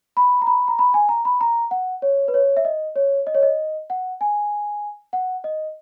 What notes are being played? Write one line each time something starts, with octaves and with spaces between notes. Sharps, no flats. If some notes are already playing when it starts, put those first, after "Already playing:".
B5
A#5
B5
A#5
B5
G#5
A#5
B5
A#5
F#5
C#5
B4
C#5
E5
D#5
C#5
D#5
C#5
D#5
F#5
G#5
F#5
D#5